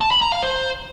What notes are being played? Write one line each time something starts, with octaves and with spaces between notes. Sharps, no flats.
A5
B5
A#5
F5
C5